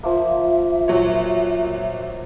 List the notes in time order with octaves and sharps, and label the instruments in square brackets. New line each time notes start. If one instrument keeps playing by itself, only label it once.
[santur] F3 A#3 [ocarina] E5
[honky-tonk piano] A#2 F#3 C#5